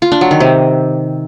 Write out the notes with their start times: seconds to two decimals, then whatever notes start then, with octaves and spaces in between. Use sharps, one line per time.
0.02 F4
0.12 D4
0.21 F#3
0.31 D#3
0.40 C3